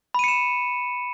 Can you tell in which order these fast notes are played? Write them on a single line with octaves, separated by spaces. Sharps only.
B5 D#7 C#7 E7